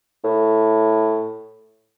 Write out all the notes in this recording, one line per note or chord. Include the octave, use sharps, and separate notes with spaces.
A2